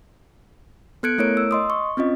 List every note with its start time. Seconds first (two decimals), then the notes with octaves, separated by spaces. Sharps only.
1.03 B3 A4 F#6 G#6 C#7 D7
1.18 A3 E4 A#4 C#5 D7
1.37 E6
1.51 D#5 C6 D#6
1.70 C#6
1.97 C4 C#4 F4 D#5